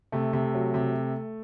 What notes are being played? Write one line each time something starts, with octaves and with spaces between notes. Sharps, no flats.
C3 A3
C3
F#3
C3